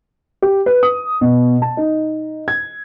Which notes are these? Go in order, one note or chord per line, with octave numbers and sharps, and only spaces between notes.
G4
B4
D#6
B2
A5
D#4
G#6